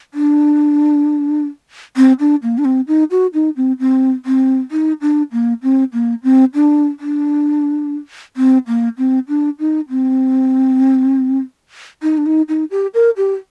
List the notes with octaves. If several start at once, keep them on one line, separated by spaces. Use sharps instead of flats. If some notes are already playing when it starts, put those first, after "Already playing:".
D4
C4
D4
A#3
D4
C4
D#4
F#4
D#4
C4
C4
C4
D#4
D4
A#3
C4
A#3
C4
D4
D4
C4
A#3
C4
D4
D#4
C4
D#4
D4
D#4
D#4
G4
A#4
G4